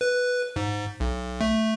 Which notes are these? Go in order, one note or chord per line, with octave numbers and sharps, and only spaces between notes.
B4
G#2
B1
A3